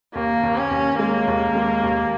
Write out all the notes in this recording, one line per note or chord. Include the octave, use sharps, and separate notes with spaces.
D#2 A#3
D#2
C#4
D#2
G#3 A#3
D#2
G#3
D#2